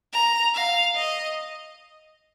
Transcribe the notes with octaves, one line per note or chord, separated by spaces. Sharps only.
A#5
F5
D#5